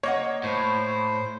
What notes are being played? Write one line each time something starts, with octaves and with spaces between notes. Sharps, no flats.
A#3 C#5 D#5 F#5
A2 C5